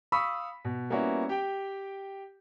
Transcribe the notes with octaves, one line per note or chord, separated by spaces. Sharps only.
F5 B5 C#6 D#6 E6 B6
B2
G3 A#3 B3 C#4 E4 F#4
G4 G5